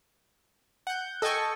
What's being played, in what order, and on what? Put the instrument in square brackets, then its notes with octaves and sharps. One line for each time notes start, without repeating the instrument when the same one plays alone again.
[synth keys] F#5 G6
A4 D#5 G5 G#5 C#6